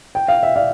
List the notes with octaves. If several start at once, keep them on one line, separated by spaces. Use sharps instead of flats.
G5
F5
E5
D5 F5